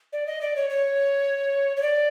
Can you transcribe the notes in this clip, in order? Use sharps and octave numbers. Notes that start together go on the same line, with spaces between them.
D5
D#5
D5
C#5
C#5
C#5
D5